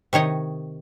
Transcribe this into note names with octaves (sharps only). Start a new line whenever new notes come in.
C3 D#3 C#5 D#5